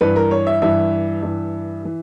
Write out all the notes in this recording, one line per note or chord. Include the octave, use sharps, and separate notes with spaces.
G2 E3 B4
A#4
C#5
E5
G2 E3 E5
G2 E3
E3